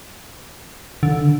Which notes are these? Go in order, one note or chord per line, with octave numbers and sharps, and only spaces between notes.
D3